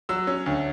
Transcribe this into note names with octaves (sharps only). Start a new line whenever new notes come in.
F#3 E6
C#4
D2